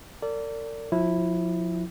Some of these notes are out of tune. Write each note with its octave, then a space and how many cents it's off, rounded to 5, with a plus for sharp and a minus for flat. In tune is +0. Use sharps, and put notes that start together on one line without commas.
A#4 -45 D5 -20
F3 +30 E4 +0